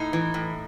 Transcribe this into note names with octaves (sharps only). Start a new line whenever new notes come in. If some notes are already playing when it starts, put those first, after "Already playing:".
Already playing: A2 D#4
E3
A2